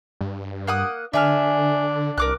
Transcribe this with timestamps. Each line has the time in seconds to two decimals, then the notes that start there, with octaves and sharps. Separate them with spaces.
0.21 G2
0.67 A#3 F#5 D#6
1.14 D3 D4 E5 G#5 F6
2.18 C2 A#4 D6 F#6